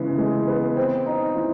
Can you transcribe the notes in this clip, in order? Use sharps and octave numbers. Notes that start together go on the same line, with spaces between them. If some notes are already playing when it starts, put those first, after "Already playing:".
Already playing: C#3 E3 G#3 B3
G#3
B3
C4
D#4
E3